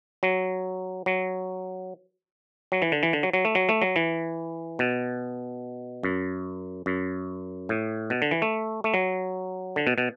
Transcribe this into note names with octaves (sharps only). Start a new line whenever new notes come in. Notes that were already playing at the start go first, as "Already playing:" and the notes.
F#3
F#3
F#3
E3
D3
E3
D3
F#3
F#3
A3
F#3
A3
F#3
E3
B2
F#2
F#2
A2
B2
D3
E3
A3
A3
F#3
D3
B2
B2